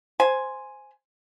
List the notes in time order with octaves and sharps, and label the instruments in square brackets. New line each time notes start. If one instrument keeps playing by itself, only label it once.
[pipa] C5 G#5